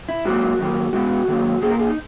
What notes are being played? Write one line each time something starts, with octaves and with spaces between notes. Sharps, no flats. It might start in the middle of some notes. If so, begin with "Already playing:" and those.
E4
G#2 F#3 A#3 F#4
F#2 D#3 A#3
B2 G#3 B3 F#4
G#2 D#3 F#3 A#3
A#2 A#3 G#4
A#4
G#4
D#4